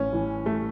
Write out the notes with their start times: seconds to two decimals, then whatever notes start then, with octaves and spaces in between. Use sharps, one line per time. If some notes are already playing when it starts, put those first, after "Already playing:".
Already playing: A1 C#4
0.12 A2 E3
0.46 A3